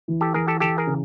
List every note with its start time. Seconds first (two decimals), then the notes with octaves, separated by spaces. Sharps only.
0.08 E3
0.21 G4 A4
0.34 E3 G#4 A#4
0.48 G4 A4
0.60 E3 G4 A4
0.78 G#4 A#4
0.87 C#3